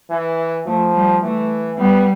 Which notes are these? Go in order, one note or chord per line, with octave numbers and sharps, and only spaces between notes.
E3
F3 A3
G3
E3 A3
G3 B3